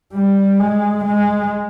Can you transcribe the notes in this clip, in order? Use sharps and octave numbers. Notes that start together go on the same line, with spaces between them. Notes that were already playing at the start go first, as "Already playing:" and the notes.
G3
G#3
G#3